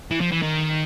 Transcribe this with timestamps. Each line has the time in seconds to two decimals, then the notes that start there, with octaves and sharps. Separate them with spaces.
0.11 E3
0.21 F3
0.31 E3
0.42 D#3